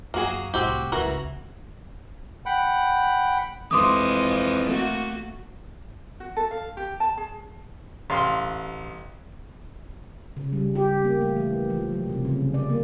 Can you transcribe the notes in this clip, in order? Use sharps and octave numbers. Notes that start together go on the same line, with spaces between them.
F#2 A#3 F#4 G#4
C2 A2 C4 F#4 G4
F#1 C#2 E3 F#4 A#4
F#5 G5 B5
F2 E3 G#3 C6 D6 D#6
A3 A#3 F#4
F#4
A4
F5
G4
A5
G#4
A1 F5 C6
C#3
G3
G4
A#3
A3
E3
F3
F#3
C3
C#3
D5
A#3